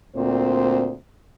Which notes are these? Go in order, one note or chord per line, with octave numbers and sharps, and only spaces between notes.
D2 A#2 C4 C5